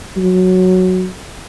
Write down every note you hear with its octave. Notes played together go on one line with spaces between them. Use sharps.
F#3